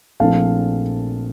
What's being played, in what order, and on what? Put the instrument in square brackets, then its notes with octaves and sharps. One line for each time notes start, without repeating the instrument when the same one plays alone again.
[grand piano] A#1 A#2 A3 C4 E4 F5 A5